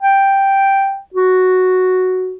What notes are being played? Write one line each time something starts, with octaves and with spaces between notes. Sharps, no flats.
G5
F#4